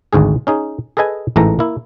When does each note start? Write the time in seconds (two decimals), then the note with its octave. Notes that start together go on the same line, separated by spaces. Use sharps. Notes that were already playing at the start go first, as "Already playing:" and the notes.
0.13 G#1 D2 G#2 G#4
0.47 C#4 D#4 G#4
0.97 G#4 A4 B4 D#5 G#5
1.36 A1 G#2 E3 A3 A#5
1.59 A#3 E4